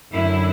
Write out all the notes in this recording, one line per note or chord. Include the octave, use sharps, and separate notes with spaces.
F#2 D3 E4